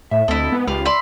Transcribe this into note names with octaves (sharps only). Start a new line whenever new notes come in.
A2 E5
D2 C4 E4 A4 D#5
G#2 B3
C#2 F4 G4 B4 F5
D5 E5 B5 C6